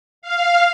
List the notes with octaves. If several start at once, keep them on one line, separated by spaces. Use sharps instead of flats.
F5